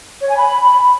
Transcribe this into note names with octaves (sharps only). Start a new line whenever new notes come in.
C#5
G#5
B5